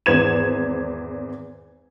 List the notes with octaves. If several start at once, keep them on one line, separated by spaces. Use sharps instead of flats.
G#1 E2 C5 G#6 E7